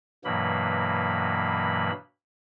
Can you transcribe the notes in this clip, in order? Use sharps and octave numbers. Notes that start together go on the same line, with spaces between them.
G2 B2 E3 F#3 A#3 B5